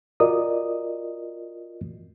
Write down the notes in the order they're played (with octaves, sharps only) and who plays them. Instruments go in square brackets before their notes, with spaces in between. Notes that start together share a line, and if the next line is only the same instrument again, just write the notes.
[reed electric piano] F4 F#4 A#4 D5 D#5 D#6